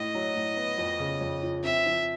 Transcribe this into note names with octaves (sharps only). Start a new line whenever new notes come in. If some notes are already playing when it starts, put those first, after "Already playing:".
Already playing: A2 D#5
F#3
A2
B3
F2
C#3
F2
F3
C4 E5
F3